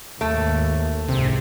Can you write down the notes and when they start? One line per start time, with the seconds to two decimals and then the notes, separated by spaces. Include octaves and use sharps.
0.21 D#2 G#2 A3
1.09 C2 G#2 C3